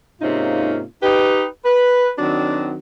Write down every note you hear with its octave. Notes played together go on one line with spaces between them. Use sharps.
G#2 C3 A#3 C#4 D#4 F4
D#4 G4 B4
B4
D#3 F#3 C4 D4 F#4